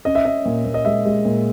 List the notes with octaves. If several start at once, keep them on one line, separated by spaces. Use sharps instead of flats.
C#4 D#5
E5
C#4 D#5
A#2
A#2
D#5
G#3 E5
G#3
A#2